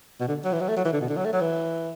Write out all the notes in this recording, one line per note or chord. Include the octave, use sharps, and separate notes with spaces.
B2
D3
F#3
E3
F#3
A3
F#3
E3
D3
B2
D3
F#3
A3
F#3
E3